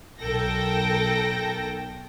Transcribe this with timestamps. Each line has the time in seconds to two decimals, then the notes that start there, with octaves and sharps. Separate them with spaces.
0.20 B1 A4 A#4 G5 A#6